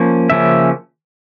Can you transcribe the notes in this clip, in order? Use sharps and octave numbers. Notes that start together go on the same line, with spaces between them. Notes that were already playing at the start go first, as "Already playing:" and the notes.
Already playing: F3 A#3 C#4
C#3 F3 A#3 C#4 E5